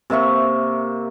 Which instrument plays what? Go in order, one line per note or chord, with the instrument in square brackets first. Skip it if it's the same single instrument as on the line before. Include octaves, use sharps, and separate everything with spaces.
[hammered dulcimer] C3 A#3 E5 C#6